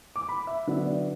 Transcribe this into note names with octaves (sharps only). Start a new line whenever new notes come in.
D6
B5
E5
D3 F#3 B3 D4 E5
D5